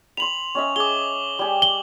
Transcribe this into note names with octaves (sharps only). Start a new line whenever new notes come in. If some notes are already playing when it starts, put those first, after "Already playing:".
B5 C6 F7 F#7
C#4 D#5 E5
G#4 D6 G7
G3 G#5
F#7 G7